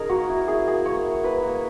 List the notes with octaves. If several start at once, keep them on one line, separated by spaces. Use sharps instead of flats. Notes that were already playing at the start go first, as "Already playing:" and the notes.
Already playing: C#4 D#4 G#4 A#4
A#3 F#4
E4
E4 G#4
A#3 G#4
A#3 C#5
E4
A#3 B4
A#3